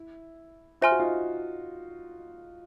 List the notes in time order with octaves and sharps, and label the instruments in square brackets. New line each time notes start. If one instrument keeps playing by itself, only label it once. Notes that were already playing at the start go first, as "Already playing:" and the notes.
Already playing: [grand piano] E4
[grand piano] F4 [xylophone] C5 E5 G#5 C6 F6
[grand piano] F#4
D#4 F4